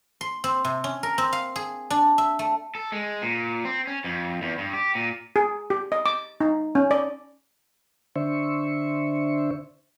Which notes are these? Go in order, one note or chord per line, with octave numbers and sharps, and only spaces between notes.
C6
C4
C3
C#4
A#4
C4
F5
G#4
D4
E5
A3
A4
G#3
A#2
C4
C#4
F2
E2
G2
G4
A#2
G#4
G4
D#5
D6
D#4
C#4
D5
D3 D4 C5 E5 C#6